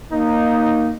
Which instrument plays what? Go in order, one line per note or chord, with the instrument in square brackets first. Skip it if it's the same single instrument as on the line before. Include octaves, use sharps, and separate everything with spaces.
[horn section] A#3 D#4